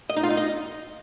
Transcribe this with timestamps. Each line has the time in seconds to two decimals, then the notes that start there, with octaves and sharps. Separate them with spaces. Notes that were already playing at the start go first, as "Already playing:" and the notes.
0.10 D#5
0.16 D#4
0.23 F4
0.30 D#4
0.37 D#5